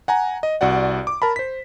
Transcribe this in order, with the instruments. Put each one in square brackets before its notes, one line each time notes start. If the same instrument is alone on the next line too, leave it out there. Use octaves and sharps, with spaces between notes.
[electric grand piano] F#5 G#5 A#5
D#5
C2 F#4 D5 F#5
D6
A#4 A5 B5
C5 B6